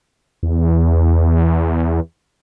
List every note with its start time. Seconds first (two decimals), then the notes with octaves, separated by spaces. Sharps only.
0.43 E2